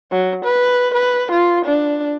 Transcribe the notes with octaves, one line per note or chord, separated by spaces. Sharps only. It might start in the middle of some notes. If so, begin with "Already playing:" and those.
F#3
B4
B4
F4
D4